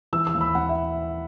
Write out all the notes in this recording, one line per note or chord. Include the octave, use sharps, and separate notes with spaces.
E3 E6
E6
D#2
B5
D#2 F#5
E5